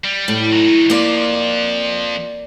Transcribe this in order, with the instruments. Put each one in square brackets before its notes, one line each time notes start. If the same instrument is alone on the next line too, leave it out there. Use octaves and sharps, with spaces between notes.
[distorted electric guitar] G3
[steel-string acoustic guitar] A2
[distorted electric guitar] F#3 D#4
[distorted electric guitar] F2 F3 [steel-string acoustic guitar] A#3 D5